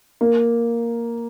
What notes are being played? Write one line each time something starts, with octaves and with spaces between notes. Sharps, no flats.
A#3